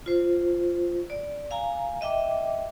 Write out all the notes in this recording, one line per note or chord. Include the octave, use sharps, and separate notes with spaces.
F4 C5
D5
F5 G#5 A#5
D#5 E5 G5 D6